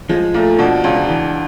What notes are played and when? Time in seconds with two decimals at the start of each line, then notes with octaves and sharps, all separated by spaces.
0.09 F3 G#3
0.34 A#2 A3
0.59 B2 D4
0.84 C#2
1.08 E3